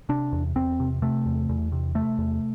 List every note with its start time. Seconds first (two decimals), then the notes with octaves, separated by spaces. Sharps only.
0.09 C3 D4
0.32 E2
0.56 E2 C4
0.80 C3
1.02 C3 A3
1.26 E2
1.49 E2
1.72 C3
1.95 C3 A3
2.18 E2